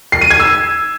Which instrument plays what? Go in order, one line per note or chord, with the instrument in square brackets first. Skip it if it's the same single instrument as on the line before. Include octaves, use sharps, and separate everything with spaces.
[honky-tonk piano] C7
D#7
G#6
E6